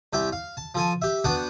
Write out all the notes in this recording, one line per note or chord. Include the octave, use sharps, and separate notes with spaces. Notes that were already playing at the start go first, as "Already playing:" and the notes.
C2 G4 E5 G5
F5
A5
F3 A4 G#5
G4 E5
B3 D4 F#4 G5 A5